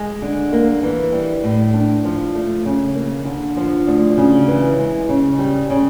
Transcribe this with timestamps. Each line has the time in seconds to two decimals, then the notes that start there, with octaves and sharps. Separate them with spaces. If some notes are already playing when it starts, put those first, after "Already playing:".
Already playing: G#3
0.22 D3
0.53 A#3
0.83 E3
1.13 G3
1.44 A2
1.74 D4
2.04 F3
2.35 A3
2.65 C#3
2.95 A#3
3.25 D3
3.57 F3
3.87 D2
4.17 C#3
4.48 E3
4.78 G#3
5.09 C#3
5.39 G3
5.70 C#3